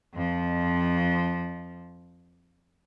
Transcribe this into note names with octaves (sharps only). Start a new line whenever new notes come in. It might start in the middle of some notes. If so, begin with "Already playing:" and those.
F2 F3